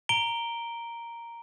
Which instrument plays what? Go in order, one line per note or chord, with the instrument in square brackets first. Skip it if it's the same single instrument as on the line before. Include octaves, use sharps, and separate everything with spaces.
[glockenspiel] A#5 D7 G7